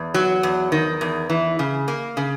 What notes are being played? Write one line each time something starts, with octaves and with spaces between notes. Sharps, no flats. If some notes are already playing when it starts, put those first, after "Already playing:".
Already playing: E2
F#3
E2
D#3
E2
E3
C#3
A#3
C#3